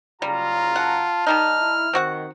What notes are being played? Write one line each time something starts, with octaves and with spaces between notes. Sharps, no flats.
F#1 C#3 G3 F4 A#5
F#5 A5
D#3 G3 D#4 F6
E4
D#3 C4 F#4 F#5